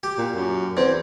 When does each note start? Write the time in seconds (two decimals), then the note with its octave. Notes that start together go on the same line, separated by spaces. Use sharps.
0.03 G4
0.18 A#2
0.35 F#2
0.77 E2 C4